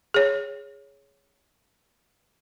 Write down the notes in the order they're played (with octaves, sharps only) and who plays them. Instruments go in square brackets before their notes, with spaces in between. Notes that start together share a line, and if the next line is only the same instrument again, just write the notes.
[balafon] G#4 C#5